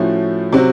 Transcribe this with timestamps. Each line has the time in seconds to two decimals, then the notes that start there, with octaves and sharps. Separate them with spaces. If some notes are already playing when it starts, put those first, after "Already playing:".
Already playing: A2 F3 A3 C#4 F#4
0.53 C3 F#3 C4 F#4